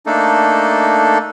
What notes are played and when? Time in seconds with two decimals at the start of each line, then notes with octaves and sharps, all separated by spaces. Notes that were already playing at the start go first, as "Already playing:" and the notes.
0.06 A3 A#3 D4 D#4 A4